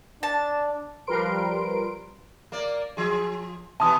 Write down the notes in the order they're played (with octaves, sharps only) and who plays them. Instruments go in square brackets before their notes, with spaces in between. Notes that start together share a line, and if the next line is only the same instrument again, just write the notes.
[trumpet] D4 [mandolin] A5
[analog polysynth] F3 G3 A#4 B4 C6 D7
[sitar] A#3 D5
F3 G#4
[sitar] B2 E3 B3 [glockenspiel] A5 D#6